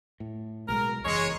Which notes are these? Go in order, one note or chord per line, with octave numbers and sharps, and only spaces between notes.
A2
B1 G#3 A#4
F#1 E2 G#3 C#5